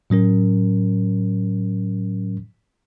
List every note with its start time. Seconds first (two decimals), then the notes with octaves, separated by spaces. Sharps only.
0.10 A2 F#3 C#4 A#4